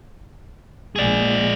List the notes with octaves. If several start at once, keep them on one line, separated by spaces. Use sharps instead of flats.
A#1 G#3 G#4 D5